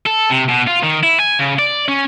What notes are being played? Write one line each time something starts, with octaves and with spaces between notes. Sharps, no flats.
A4
C3
B2
F4
D#3
E4
G#5
C#3
D5
C#4